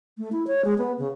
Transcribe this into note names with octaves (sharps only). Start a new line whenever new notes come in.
A3
E4
C#5
G#3
B3
C#3